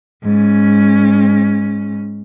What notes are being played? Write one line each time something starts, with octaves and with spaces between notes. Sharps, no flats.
G#2 C#4